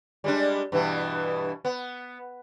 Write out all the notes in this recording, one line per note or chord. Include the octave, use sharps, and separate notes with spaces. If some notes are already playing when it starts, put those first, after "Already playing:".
G3 G#3 D4
G2 B2 E3
B3